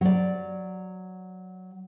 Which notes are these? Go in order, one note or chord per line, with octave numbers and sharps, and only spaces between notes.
F#3 D5